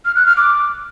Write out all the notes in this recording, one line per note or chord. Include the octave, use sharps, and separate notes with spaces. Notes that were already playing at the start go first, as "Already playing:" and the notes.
F6
F#6
F6
D6